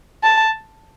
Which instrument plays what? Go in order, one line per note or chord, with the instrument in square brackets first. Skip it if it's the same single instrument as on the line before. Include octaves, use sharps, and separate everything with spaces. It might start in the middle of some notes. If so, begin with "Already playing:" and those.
[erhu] A5